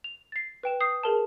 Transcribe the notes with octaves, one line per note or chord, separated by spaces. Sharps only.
F7
A6 C7
B4 G5 E7
D#6 G6 C7
G#4 A#4 A5